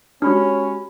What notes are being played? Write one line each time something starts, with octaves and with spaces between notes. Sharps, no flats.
G#3 C#4 D4 F#4 G4 B5 F6